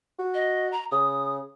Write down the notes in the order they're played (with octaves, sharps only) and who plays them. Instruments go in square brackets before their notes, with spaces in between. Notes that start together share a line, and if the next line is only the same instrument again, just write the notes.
[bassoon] F#4
[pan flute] D#5
A#5
[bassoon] C#3 [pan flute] D#6